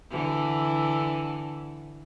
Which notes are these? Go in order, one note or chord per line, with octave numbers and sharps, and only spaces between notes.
D3 E3